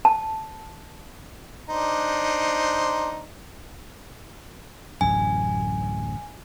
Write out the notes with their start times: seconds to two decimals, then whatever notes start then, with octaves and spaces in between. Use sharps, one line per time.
0.05 A5
1.69 D4 D#4 C5
5.01 D1 A1 F#2 G#5